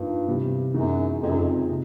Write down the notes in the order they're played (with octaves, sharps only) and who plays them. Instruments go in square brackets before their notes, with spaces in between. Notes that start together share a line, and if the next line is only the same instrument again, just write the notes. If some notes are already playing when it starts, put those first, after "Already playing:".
Already playing: [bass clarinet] G2 [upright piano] F3 A#3 D#4
[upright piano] C3 E3 G3 B3
[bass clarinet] F#2 [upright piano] E3 G#3 B3 D#4 F#4
[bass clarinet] F2 [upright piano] C#3 F3 G#3 C4 D#4
[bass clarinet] F#2
F2
[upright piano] C3